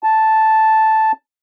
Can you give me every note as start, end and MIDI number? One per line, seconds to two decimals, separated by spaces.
0.03 1.12 81